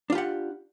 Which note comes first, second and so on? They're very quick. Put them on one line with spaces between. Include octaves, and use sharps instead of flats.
D4 F4 G4 F#5